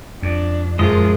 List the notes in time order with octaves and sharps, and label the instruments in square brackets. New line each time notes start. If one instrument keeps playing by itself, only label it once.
[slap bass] F2 [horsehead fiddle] D4
[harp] F#2 A#2 F#3 [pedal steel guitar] F3 G#3 D#5 [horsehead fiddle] F4 G#4